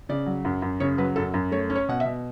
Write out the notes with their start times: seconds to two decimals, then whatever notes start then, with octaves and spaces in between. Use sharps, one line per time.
0.09 C#3 D5
0.26 F#3
0.45 F#2
0.62 F#2
0.80 C#3 C#5
0.98 F#3 B4
1.16 F#2 A4
1.34 F#2
1.52 A3 C#5
1.70 C#4
1.75 C#5
1.88 B2 F#5
2.00 E5
2.05 B2